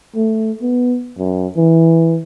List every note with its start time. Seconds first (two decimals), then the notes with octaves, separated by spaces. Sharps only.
0.16 A3
0.62 B3
1.18 F#2
1.57 E3